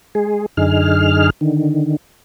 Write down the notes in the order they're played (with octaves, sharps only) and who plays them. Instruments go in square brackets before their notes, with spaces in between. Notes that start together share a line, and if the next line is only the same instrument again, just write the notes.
[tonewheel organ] G#3 G#4
F#2 D3 D#4 G#4 F6
D3 D#3